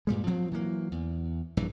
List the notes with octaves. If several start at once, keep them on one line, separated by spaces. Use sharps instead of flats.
G2 A#2 G3 G#3
F3 F#3 C4
E3 F#3 A#3
E2
A#1 G2 E3